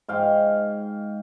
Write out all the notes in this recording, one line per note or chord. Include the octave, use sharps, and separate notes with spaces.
G#2 F5 G5